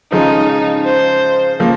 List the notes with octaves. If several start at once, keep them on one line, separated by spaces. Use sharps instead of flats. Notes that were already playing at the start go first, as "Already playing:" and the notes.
C#3 F3 G#3 C#4 D#4
C5
C#3 F3 A#3